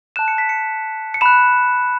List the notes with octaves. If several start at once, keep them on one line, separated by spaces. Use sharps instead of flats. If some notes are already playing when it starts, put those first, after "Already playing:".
A5 F#6 E7
C#7
B6
C#7
C#7
B5 F#6 E7